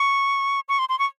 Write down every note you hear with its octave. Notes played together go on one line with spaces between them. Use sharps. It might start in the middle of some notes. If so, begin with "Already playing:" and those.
Already playing: C#6
C#6
C6
C6
C#6